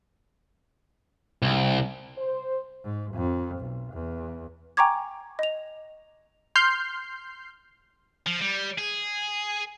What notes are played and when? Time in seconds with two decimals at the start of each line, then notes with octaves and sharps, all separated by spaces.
1.42 C2
2.17 C5
2.84 G#2
3.15 F2
3.58 B1
3.93 E2
4.77 G5 G#5 A#5 C#6 D6 G#6
5.39 D#5 F7
6.55 C6 F6 G6 C7
8.26 F3
8.41 G3
8.78 G#4